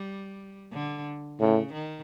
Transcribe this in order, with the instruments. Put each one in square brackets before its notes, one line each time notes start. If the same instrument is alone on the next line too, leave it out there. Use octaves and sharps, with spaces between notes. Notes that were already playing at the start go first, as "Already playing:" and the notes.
Already playing: [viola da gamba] G3
D3
[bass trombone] A2 [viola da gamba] C#3
[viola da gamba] D#3